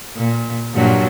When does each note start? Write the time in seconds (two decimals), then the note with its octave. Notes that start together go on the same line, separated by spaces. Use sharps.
0.16 A#2
0.74 G2 A#2 F#3